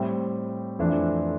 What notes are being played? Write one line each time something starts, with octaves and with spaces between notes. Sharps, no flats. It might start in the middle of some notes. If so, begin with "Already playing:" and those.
Already playing: A2 G3 C4
F2 E3 A3 D4